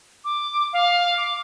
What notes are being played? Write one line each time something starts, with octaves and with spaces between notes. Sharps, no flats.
D6
F5
D6